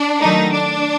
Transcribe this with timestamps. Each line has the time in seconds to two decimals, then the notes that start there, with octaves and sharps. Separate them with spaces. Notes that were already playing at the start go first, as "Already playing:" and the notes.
Already playing: D4
0.21 D#3 F#3 A3 D#4
0.53 D4